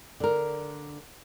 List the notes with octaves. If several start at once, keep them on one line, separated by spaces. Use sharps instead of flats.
D3 A#4